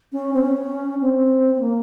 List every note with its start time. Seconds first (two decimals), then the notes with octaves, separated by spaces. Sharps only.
0.12 C#4
0.34 C4
0.42 C#4
1.01 C4
1.55 C4
1.60 A#3